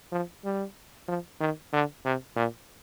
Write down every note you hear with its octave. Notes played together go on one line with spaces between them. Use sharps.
F3
G3
F3
D#3
D3
C3
A#2